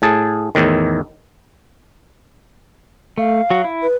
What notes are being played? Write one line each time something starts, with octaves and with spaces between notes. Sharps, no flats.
A2 G#4 A5
E2 A2 D#3
A3 F5
F#3 F#4
E4
B4